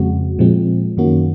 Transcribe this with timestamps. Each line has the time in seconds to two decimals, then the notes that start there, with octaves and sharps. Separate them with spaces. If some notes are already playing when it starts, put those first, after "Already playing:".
Already playing: F2 C#3 G#3 C4 F#4
0.39 A#2 F3 G#3 C4
0.97 F#2 D#3 A#3 C#4 F#4